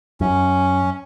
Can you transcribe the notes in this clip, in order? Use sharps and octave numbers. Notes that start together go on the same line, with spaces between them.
F#2 C#4